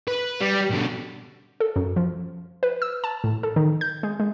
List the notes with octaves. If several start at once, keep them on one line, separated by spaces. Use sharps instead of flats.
B4
G3
B2 D3
A4
F#2
F3
B4
E6
A5
A2
A4
D#3
G6
G#3
G#3